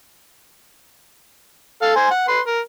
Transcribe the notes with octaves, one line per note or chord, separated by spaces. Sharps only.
A4 F5
C5 G#5
F#5
B4 C6
A#4